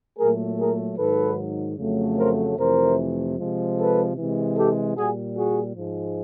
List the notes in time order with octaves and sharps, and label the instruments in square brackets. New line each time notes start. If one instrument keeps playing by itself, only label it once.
[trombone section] A#2 F#3 A3 G#4 A#4
G#4 A#4
G#2 D#3 F#3 A4 B4
F2 C#3 F#3 A3
A#4 C5
F2 C3 E3 A3 A#4 C5
C3 F3 G#3
A4 B4
C3 E3 G#3
G4 A4
A#2 G3 F#4 G#4
F#4 G#4
G#2 F3 G#3